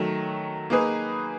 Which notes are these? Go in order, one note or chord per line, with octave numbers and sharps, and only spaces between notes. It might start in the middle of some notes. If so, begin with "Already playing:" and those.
Already playing: D#3 F#3 A3
A#3 D#4 G#4 B4